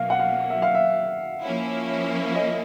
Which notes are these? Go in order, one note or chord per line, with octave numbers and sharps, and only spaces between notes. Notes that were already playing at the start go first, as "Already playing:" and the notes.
Already playing: B2 F#3 A#3 F5
F#5
F5
E5
F5
E5
F3 A#3 C#4 E4
D#5